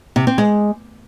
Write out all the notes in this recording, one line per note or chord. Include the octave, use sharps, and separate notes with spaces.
C3
C4
G#3